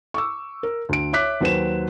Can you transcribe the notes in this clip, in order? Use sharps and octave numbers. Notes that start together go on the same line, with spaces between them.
C#6 D6 E6
A#4
D2 D7
C#5 E5 D6 F#6 B6
D#2 F#3 B4 C5 E7